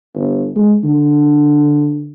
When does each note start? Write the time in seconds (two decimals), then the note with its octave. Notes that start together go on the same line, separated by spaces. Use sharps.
0.15 G1
0.56 G#3
0.84 D3